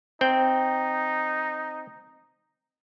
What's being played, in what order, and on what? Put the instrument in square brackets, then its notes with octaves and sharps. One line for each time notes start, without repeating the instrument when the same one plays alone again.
[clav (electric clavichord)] C4 G5 [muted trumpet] D#4